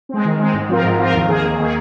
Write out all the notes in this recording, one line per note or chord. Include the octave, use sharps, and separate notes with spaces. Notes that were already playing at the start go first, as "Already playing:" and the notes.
G#3 C4
D#3
G#3 C4
G#2
F3 C4 F4 A#4
G#2
F3 C4 F4 A#4
D#2
D#3 A#3 G#4
D#2
D#3 A#3 G#4